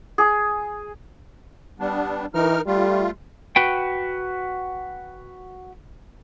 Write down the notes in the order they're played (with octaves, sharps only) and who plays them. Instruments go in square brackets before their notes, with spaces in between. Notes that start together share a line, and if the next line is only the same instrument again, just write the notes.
[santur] G#4
[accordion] G3 B3 D4
[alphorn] E3 [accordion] D#4 A#4 F6
[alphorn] G3 [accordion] A3 F4
[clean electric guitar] F#4 B4 G5